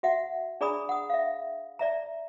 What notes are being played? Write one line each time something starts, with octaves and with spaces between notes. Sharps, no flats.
F#4 E5 F#5
D4 G#4 D5 A#5 B5 D#6
F#5 D#6
E5 F5
D5 E5 A#5